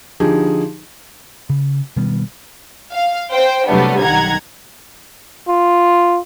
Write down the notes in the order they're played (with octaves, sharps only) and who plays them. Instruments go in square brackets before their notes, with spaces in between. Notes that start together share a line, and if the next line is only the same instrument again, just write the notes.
[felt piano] D3 F3 D#4 G4 G#4
[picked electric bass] C#3
B2 D#3 G3 B3
[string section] F5
C5 G5
C3 F#3 G3 A3 B3 D4
B1 D#3 F#5 A#5 G#6
[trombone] F4